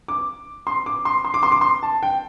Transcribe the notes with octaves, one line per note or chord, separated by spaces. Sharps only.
D6
C6
D6
C6
C6
D6
C6
D6
C6
A5
G5